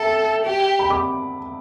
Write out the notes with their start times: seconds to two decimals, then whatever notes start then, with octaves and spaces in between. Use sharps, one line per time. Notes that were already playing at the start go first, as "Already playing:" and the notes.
Already playing: A4 E5 G5 A5
0.45 G4
0.79 B5
0.90 D6